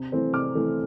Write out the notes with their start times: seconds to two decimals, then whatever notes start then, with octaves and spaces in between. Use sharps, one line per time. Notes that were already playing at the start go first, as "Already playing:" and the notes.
Already playing: C3
0.12 E3 A3 C4
0.33 C3 D6 F6
0.55 E3 A3 C4